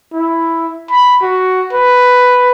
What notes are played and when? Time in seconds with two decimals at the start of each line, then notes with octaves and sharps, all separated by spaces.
0.13 E4
0.91 B5
1.22 F#4
1.73 B4